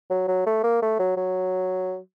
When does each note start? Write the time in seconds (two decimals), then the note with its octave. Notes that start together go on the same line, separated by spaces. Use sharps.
0.10 F#3
0.28 F#3
0.46 A3
0.64 A#3
0.82 A3
0.99 F#3
1.17 F#3